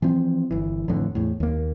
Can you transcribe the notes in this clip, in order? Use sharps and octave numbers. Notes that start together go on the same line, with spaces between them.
E3 F3 C4
G1 E3
A1 F2 A2 D3
E2 A2
D#2 A#3